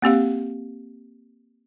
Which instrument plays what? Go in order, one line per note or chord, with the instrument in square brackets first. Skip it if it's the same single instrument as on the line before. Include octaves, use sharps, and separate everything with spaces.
[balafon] A#3 C4 G4 F5